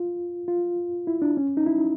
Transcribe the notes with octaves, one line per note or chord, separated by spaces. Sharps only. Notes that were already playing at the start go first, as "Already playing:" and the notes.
Already playing: F4
F4
E4
D4
C#4
D#4
E4